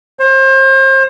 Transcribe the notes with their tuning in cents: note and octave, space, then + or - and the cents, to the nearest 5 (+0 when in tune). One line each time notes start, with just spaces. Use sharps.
C5 +35